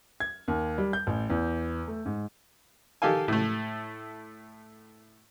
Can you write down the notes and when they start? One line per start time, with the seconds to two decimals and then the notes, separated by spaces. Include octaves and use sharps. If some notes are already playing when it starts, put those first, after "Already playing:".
0.20 G#6
0.48 D#2
0.78 G3
0.93 G6
1.07 A1
1.30 E2
1.87 A3
2.06 G#2
3.02 D#3 G4 A4 F5 G#5
3.28 A2 A3